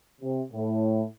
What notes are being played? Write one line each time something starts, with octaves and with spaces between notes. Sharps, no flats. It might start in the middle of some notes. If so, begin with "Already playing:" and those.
C3
A2